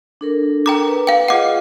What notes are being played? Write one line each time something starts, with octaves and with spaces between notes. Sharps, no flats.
D4 A4 A#4
G5 A#5 D6
B4
F5 G5
F4 G#4 D#5 F#5 D6